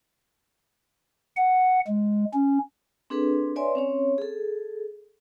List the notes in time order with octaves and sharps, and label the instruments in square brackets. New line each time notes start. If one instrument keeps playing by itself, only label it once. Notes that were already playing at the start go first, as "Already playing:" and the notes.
[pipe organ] F#5
G#3
C#4
[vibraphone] C4 D4 G#4 A4 B4
B4 C#5 D5 E5 G#5 C6
C4 C#4 C#5
G#4 A4